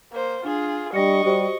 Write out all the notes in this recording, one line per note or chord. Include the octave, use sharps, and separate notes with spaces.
A#3 C5
D4 F4 G#4
G3 D4 D#5 C#6 A#6 C#7
G3 F#4 G4 C5